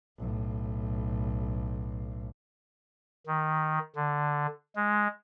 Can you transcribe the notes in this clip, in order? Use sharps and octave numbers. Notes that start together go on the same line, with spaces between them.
B1 A2
D#3
D3
G#3